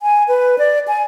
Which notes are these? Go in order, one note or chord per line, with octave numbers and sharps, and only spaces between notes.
G#5
B4
D5
G#5